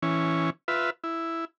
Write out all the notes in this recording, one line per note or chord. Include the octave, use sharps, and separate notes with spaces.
E3 C#4
F4 B4 E5
E4